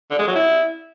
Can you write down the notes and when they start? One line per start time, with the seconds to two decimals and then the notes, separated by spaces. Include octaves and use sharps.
0.10 D3
0.19 G#3
0.27 F#3
0.35 E4